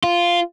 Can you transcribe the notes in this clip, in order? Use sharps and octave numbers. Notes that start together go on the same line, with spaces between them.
F4